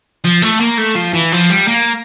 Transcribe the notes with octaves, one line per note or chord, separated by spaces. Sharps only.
F3
A3
A#3
A3
F3
E3
F3
G3
A#3